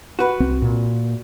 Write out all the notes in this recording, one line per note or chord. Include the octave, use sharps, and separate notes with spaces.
F#4 B4
C2 C4
A#2